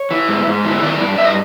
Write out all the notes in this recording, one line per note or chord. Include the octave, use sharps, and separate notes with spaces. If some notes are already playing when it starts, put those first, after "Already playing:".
Already playing: C#5
E3
G#2
G#2
E3
D#3 D5
G2
G2 E5
D#5